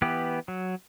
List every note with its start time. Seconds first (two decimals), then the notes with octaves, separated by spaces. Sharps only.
0.02 E3 B3 G4
0.48 F#3